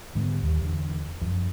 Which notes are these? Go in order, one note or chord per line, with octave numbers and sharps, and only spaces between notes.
G#2 D3 G3 B3
D#2 G3
E2 D3
F#2 F3